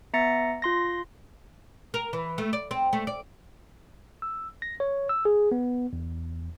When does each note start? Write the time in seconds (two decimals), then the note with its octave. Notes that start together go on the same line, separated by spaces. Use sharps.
0.14 B3 E5 A#5 A6 A#6 C#7
0.62 F4 C6 A#6
1.94 A#4
2.13 E3
2.38 A3
2.53 D5
2.71 C4
2.93 A3
3.07 D5
4.22 E6
4.62 A#6
4.80 C#5
5.09 E6
5.25 G#4
5.52 B3
5.93 E2